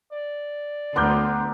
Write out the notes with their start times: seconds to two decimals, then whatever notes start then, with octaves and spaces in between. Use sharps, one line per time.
0.12 D5
0.96 D2 B3 D4 A#4 C6 D6 G6